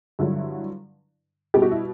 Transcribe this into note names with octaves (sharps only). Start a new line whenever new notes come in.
G2 D3 F#3 E4
B2 G3 G4
F#4
E4